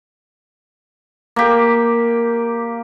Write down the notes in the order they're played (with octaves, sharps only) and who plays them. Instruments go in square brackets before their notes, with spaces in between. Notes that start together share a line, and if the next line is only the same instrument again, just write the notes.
[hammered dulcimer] A#3 G4